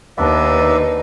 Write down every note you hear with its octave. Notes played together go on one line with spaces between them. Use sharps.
D#2 B3 D4 D#4 B4 D5 E5